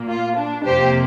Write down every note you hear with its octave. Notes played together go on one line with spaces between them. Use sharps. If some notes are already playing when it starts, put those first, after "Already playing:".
Already playing: A#2 A#3
F4
D4
F2 C3 A#3 G4 C5